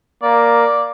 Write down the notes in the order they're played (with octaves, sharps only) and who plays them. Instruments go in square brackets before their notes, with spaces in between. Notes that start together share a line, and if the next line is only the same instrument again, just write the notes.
[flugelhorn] A#3 [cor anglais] D5